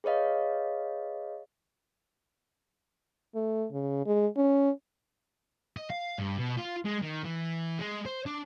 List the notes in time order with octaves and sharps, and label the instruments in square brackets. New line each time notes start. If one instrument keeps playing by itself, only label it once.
[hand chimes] G#4 B4 C#5 D#5 F5
[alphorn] A3
C#3
G#3
C#4
[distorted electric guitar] D#5
F5
G2
B2
F4
G#3
D#3
E3
G#3
C5
D4